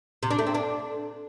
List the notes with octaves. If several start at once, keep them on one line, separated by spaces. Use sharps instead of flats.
C3
D4
A3
C4
D4